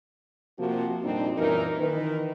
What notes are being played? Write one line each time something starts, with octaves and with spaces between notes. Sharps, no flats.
C3 F3 A#3 F#4
F2 A#2 G3 C4 D4 D#4
F#2 A#2 E3 D#4 A#4
D#3 E3 B4